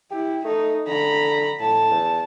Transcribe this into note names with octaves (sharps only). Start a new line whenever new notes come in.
E4 G4
A3 D#4
D3 A#5 B5
A2 A5
E2